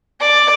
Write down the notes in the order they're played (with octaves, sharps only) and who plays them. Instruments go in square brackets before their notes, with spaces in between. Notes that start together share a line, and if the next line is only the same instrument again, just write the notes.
[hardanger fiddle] D5